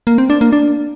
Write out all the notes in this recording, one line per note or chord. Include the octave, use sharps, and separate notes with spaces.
A#3
C4
D4
A#3
D4